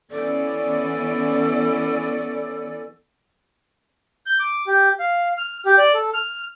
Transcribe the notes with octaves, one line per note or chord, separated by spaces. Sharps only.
E3 B3 C#4 A4 D5
G6
D6
G4
F5
F6
G4
D5
A4
F6